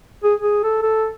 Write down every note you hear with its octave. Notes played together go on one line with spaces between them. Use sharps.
G#4
G#4
A4
A4